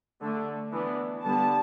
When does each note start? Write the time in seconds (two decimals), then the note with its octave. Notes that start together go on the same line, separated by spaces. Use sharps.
0.21 D3 A3 D4
0.73 E3 B3 D4
1.24 D3 G3 B3 A5